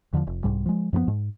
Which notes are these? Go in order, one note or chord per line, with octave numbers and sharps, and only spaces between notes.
E2 D3 E3 F3
F1
C2 G#2 G3
F3 G#3
F#2 F3 G3 B3
G#2